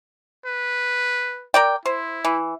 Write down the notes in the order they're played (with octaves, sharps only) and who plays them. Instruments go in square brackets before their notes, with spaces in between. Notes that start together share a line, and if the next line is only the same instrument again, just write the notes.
[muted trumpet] B4
[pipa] A#4 D5 G5
[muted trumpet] E4 [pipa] C5
[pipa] E3